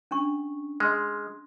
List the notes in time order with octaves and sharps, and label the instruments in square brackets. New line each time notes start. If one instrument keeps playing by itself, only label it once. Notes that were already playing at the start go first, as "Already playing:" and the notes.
[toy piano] C#4 D4 C#6
[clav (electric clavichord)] G#3 [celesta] D#5 C6 F6